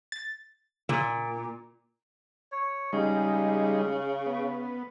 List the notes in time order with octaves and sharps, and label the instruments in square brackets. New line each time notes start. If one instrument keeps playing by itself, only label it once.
[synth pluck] A6
[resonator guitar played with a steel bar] A#2 [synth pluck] C#3
[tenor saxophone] C#5
[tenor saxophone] C#3 [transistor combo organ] G3 G#3 D#4
[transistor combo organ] B3